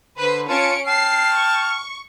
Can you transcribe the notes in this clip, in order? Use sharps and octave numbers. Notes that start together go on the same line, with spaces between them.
D3 B4 C5
C#4 F4 A5 C#7 D7
G5 A5 F6 C7
C#6